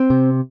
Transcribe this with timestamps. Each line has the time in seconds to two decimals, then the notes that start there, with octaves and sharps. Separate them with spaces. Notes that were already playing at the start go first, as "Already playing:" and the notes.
Already playing: C4
0.10 C3